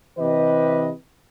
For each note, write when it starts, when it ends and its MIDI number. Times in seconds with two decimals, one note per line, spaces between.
0.18 0.89 48
0.18 0.89 52
0.18 0.89 67
0.18 0.89 71
0.18 0.89 75